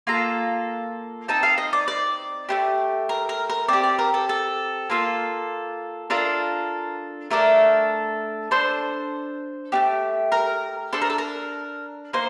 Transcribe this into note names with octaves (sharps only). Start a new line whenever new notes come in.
A#3 F4 A4 A#5
C4 D#4 A4 A5
F5
D#5
D5
D5
A3 D4 G4
A#4
A#4
A#4
C4 G4 D5
D5
A#4
A4
A4
A#3 F4 A4
D4 F4 A4 A#4
A3 D4 A4 A#4
D4 A4 C5
A3 D4 G4
A#4
D4 A4 C5
A#4
A4
A#4
A#3 D#4 C5